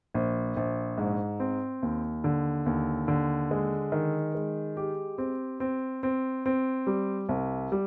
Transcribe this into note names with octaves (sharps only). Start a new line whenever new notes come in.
A#1
A#1
G#2
C4
D#2
D3
D#2
D3
G#3
D#3
G#3
G4
C4
C4
C4
C4
G3
C2
G3